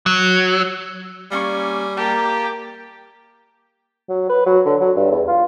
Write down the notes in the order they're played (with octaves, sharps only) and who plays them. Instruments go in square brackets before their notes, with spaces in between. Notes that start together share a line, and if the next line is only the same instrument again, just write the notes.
[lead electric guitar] F#3
[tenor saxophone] G3 [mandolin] A#3 C#4 C#6 [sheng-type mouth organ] G#5
[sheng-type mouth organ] A#3 [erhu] G4 [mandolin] A5
[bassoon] F#3
B4
F#3
D3
F#3
G2
E2
F4